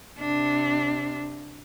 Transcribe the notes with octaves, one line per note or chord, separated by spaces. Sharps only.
C3 D4